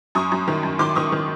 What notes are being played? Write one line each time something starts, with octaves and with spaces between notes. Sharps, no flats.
F#2 C#6 D#6
F#2
D#3
F#2
D#3 C6 D6
D#3 C#6 D#6
D#3